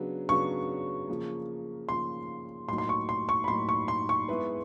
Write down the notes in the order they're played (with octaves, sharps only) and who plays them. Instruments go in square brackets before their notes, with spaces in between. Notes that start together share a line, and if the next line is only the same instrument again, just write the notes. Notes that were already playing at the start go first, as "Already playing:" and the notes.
Already playing: [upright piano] C#3 F#3 B3 D4
[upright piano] C#3 F#3 B3 D4 [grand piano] C#6
[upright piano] C#3 F3 A#3
[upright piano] C#3 F3 A#3 [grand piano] C6
[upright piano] A2 F#3 A#3 D#4 [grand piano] C6
[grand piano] C6
C#6
C6
C#6
B5
[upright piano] A2 F#3 A#3 D#4 [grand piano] C6
[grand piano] C#6
C6
C#6
[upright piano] G#3 B3 E4 G#4 B4